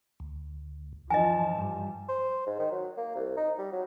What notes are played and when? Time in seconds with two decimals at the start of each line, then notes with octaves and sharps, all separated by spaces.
0.20 D2
1.10 F#2 E3 F3 D#5 G#5 A5
1.54 G2 G3
2.08 C5
2.46 G#2
2.59 D#3
2.71 F#3
2.97 A#3
3.15 C2
3.37 D#4
3.58 G3
3.72 F#3